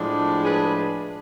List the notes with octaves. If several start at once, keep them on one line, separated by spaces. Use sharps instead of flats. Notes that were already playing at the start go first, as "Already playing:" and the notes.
Already playing: A2 F3 G#3 D4
G#4 B4